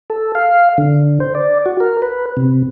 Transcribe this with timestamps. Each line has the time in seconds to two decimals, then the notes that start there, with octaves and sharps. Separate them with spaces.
0.10 A4
0.35 F5
0.78 D3
1.20 C5
1.35 D5
1.66 F#4
1.80 A#4
2.02 B4
2.37 C3